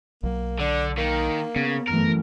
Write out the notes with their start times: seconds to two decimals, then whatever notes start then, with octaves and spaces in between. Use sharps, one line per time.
0.23 B1 F#3 A#3
0.60 D3 D4
0.98 D#3 A#3
1.56 C#3 B3
1.88 F#2 E3 A3 A#4